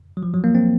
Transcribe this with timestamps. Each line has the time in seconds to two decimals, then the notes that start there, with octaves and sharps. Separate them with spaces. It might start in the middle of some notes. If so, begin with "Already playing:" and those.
0.17 F#3
0.23 F3
0.34 F#3
0.44 A#3
0.55 C4